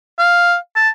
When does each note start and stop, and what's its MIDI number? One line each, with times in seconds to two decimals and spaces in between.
0.19 0.56 77
0.76 0.89 81